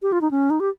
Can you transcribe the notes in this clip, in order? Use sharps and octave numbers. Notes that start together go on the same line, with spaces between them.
G4
F4
D#4
C#4
D#4
G4